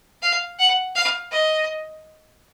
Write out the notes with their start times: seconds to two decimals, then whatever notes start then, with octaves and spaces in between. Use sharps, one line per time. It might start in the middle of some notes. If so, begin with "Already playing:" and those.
0.22 F5
0.59 F#5
0.95 F5
1.32 D#5